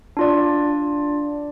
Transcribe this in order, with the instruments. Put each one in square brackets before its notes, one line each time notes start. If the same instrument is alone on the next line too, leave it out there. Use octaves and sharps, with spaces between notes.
[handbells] D4 F4 D5